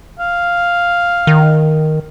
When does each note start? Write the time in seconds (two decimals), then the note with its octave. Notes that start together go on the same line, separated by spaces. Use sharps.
0.20 F5
1.27 D#3